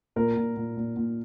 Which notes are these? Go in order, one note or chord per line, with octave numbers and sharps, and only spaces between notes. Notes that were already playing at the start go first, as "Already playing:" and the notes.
A#2 A#4
A#2
A#2
A#2
A#2